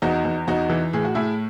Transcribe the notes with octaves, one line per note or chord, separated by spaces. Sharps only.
E2 D#4 F#4
E2
E2 D#4 F#4
E3
A2 G#4
F#4
A2 E4 G#4